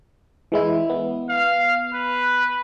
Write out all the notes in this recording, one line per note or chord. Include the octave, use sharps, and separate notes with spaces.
E3 G#3 E4
B3
F5
B4